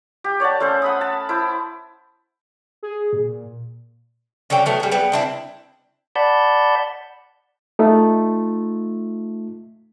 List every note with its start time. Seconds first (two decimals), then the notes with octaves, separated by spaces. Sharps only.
0.24 G4
0.40 C#5 D5 F#5 A5
0.60 A3 C#4 C5
0.82 F#5 B5 D#6
1.01 A5
1.29 E4 C5
2.83 G#4
3.13 A#2
4.50 D3 F#3 C#4 G5
4.66 F#3 A3 B3
4.80 G3 G#4
4.92 G3 B3
5.12 C4 D4 E4
6.16 D5 F#5 A5 B5 G6
7.79 A3 D#4 F4